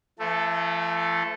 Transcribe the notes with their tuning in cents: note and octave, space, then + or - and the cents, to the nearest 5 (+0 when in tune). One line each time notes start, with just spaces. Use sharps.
F3 -45 A3 +0 A4 +0